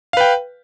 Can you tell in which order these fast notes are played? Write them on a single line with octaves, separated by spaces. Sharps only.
F5 B4 G5